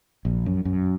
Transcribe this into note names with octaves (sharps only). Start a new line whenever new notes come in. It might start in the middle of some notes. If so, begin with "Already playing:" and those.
A#1
F#2
F#2